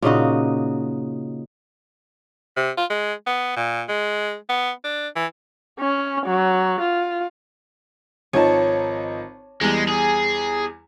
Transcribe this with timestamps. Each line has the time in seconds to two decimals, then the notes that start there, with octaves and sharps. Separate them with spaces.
0.02 A#2 C#3 D#4 F#4
2.57 C3
2.77 F4
2.90 G#3
3.27 B3
3.57 A#2
3.89 G#3
4.49 B3
4.84 D4
5.16 E3
5.79 C#4
6.26 F#3
6.81 F4
8.33 G#1 F3 D#4 C#5 A5
9.61 E2 G3 G#3
9.89 G#4